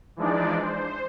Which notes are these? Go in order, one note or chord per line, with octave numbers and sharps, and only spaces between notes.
E3 F3 G#3 D4 D#4 D5
C5